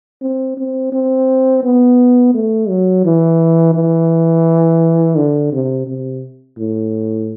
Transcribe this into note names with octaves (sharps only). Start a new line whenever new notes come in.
C4
C4
C4
B3
A3
F#3
E3
E3
D3
C3
C3
A2